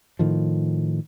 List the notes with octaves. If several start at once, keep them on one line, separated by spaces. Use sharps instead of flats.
A2 D#3 F3